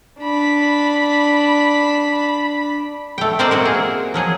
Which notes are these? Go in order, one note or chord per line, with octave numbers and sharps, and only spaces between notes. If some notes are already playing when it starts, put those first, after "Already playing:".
D4 B5
A3 G5
C4 A#4 C5 D5 D#5 A#5
A#3 F#4 A#4
G#4
F3 F#3 G#4